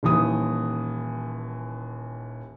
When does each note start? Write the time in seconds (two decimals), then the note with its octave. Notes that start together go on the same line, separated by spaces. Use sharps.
0.03 D#1 D#2 E3 D#6